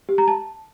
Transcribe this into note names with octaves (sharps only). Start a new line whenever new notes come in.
G4
A#5
A5